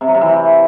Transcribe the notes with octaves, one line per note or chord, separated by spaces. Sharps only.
C3
F#3
C3
E3